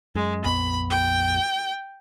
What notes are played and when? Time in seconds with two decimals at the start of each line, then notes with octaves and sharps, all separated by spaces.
0.15 F#2 G#3
0.45 A#1 F2 B3 B5
0.90 G5